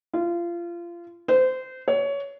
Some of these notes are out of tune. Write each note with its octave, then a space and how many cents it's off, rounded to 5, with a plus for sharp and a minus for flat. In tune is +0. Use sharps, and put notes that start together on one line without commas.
F4 -25
C5 -25
C#5 +20